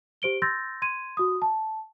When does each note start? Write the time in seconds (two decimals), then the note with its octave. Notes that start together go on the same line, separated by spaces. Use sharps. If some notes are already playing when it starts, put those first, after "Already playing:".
0.22 G4 C5 D7 G7
0.42 C6 E6 G6 A6 A#6
0.82 C6 G#6 D#7
1.17 F#4 D#6
1.42 A5